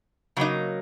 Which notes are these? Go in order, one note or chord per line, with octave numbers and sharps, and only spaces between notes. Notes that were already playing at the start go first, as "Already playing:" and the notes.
C#3 F#3 A#3 D#4